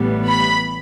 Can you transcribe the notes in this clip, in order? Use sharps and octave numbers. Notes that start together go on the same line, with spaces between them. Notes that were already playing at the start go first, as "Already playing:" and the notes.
Already playing: A1 A2 E3 G3 B3
B5